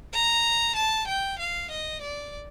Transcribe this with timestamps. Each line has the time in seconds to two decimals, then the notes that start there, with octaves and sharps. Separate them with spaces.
0.14 A#5
0.76 A5
1.08 G5
1.39 F5
1.71 D#5
2.02 D5